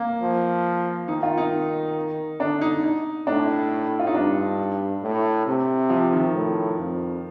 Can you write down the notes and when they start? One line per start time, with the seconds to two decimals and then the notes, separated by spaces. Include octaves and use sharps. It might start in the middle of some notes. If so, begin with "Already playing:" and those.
Already playing: A#3
0.21 F3
1.08 D#3 D#4
1.23 F4
1.38 D#4
2.40 D3 D4
2.61 D#4
2.84 D#4
3.27 A2 D4
3.99 F4
4.07 D#4
4.14 G2 D4
5.03 A2
5.47 C3
5.90 F3
6.13 D#3
6.34 A2
6.78 F2